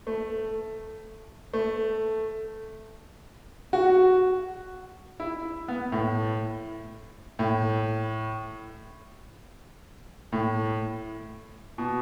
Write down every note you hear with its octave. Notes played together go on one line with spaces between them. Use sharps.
A3
A3
F#4
E4
B3
A2
A2
A2
B2